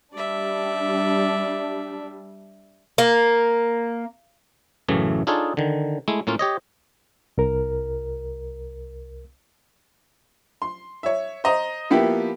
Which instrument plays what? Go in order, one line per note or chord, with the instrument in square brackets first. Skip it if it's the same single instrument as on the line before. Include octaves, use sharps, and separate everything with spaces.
[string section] G3 D4 [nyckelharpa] D5 E5
[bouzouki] A#3
[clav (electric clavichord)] A1 F#2 C#3 E3 A3
D4 D#4 F4 G#4 A4 C#5
D3 D#3
G#3 A3 E4
A2 A#3 C#4 F4
G4 C#5 D#5
[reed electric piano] C2 A#4
[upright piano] C6
C#5 E5
C5 D#5 A#5
F3 A#3 B3 E4 G4